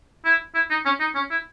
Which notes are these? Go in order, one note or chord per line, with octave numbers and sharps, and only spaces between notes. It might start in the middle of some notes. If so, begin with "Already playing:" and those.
E4
E4
D#4
C#4
D#4
C#4
E4